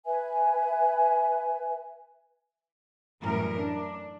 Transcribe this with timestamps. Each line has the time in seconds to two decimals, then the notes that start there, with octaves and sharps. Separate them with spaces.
0.05 B4 E5 G#5
3.22 F#2 A2 E3 G3 A#4
3.57 D4